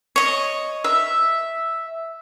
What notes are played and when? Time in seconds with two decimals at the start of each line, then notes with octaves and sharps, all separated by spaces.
0.16 C#5 D#5
0.84 E5